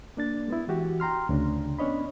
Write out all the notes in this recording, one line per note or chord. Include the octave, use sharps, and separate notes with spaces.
A#3 D4 A6
G#3 B3 E4
E3 F#4 G4
G5 A#5 C6 F6
D2 C#3 D4
B3 C#4 D4 C#5 D#5 B5